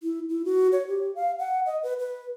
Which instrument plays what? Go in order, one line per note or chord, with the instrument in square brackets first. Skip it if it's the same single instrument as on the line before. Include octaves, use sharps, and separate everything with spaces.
[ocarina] E4
E4
F#4
C#5
G4
F5
F#5
D#5
B4
B4